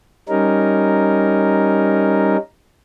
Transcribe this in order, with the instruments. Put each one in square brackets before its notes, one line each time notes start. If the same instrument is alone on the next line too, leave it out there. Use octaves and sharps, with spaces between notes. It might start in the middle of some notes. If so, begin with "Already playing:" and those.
[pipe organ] G3 C#4 D#4 A#4